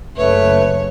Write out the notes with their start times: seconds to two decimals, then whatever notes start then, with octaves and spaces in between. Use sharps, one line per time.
0.17 F#1 C#3 F#3 A3 B4 C#5